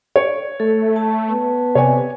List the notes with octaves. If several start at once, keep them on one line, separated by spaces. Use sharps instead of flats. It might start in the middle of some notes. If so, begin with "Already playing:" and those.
C#5 D5
A3 A4
A5
B3
C3 C#5 D5 G#5